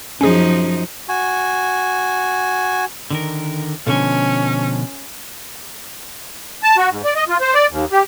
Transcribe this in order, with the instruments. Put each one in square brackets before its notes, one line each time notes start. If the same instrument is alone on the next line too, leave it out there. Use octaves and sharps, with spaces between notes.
[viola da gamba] F#2 F3 D#4 [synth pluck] C#4 G#4
[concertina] F#4 G#5
[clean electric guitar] D3 D#3 A#4
[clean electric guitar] B2 D3 F3 [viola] C#4
[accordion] A5
F#4
G#2
D5
D#5
F4
C5
D5
D#2
G4